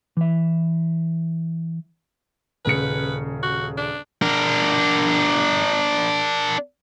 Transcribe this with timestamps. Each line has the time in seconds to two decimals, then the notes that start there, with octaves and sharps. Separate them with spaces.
0.17 E3 E5
2.65 D#1 C#3 B4 C#7
3.43 F#4
3.78 D4
4.22 D4 A#4